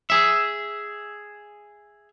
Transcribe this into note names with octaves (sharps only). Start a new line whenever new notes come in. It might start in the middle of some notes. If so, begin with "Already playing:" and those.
G#4 E5